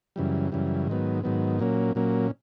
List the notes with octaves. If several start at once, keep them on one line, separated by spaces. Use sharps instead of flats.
F#2 C#3 E3 G3
F#2 C#3 E3 G3
G#2 D#3 F#3 B3
G#2 D#3 F#3 B3
A#2 F#3 A#3 C#4
A#2 F#3 A#3 C#4